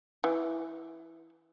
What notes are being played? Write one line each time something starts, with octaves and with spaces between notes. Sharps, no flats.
E3